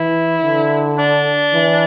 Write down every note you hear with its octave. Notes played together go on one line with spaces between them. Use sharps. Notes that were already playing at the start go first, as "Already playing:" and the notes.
Already playing: E3 E4
D3
D4
E3